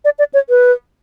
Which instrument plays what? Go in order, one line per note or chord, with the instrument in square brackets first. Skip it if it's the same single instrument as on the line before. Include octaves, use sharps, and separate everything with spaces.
[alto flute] D5
D5
C#5
B4